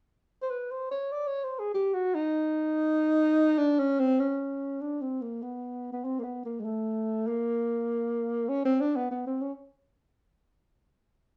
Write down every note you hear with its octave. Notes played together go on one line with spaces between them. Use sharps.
C5
B4
C5
C#5
D5
C#5
C5
G#4
G4
F#4
D#4
D4
C#4
C4
C#4
D4
C4
A#3
B3
B3
C4
A#3
B3
A#3
G#3
A3
A#3
C#4
C4
D4
B3
B3
C4
C#4